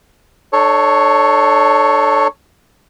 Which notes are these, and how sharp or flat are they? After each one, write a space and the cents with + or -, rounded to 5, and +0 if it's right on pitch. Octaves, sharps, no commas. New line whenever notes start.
D4 +40 A4 +0 C#5 +0